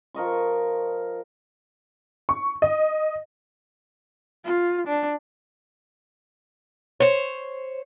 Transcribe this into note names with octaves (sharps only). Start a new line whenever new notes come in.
F3 A#4 D#5 C#6
C#6
D#5
F4
D4
C5 C#5